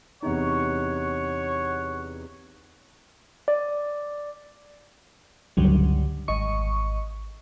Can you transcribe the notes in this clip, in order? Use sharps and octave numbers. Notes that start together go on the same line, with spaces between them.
E2 C3 D#4 C#5 F#5 C#6
D5
C#2 G2 D3 F#3 G3
G#1 D#5 C#6